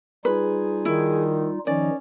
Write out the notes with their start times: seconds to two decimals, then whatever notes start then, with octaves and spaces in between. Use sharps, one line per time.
0.25 G3 D#4 F4 G#4 B4
0.85 D#3 E4
1.67 D#3 F3 C#4 D#4 D5